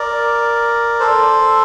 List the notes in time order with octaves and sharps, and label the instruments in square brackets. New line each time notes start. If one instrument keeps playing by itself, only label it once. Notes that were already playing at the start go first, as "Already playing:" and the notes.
Already playing: [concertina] A#4 D5
A4 C5